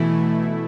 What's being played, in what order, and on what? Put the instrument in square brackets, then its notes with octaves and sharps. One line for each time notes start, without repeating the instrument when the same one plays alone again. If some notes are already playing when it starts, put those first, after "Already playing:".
Already playing: [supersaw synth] B2 A3 E4 [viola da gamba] E3